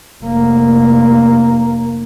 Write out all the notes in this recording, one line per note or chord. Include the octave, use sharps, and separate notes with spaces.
F1 A#3